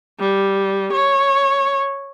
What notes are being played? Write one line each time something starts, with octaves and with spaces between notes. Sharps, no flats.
G3
C#5